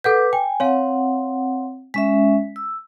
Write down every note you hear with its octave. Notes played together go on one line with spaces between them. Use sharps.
A4 B4 F#5 D6 G6
G5 G#5
C4 C#5 F5 F#5
G#3 C#4 E5 B6
E6